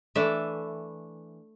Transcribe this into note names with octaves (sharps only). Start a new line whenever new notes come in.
E3 A3 D4 E5